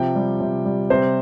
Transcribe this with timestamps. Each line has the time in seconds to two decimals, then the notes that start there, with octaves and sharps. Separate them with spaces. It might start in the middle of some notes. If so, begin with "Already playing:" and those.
Already playing: C3 F3 G5
0.16 G3
0.41 C3
0.66 G3
0.90 C3 C5